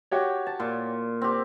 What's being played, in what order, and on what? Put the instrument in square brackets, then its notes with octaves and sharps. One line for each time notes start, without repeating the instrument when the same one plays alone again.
[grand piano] F#4 G4 C#5
[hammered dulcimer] A5
A#2
C4 G4